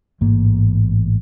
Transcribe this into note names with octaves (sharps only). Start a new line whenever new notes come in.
A1 G#2 A#3